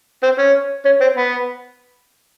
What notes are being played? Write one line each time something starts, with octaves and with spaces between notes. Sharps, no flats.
C4
C#4
C#4
C4
B3